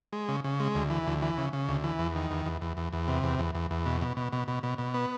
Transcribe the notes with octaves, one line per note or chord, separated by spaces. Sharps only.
G#3
C#3
C#3
G#3
D2
E3
D2
E3
C#3
C#3
D2
E3
E2
D#3
E2
E2
E2
E2
E2
C3
E2
E2
E2
E2
B2
B2
B2
B2
B2
B2
B2
B3